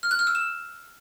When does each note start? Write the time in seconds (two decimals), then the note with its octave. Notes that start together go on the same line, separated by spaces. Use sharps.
0.03 F6
0.11 F#6
0.19 F6
0.27 E6
0.35 E7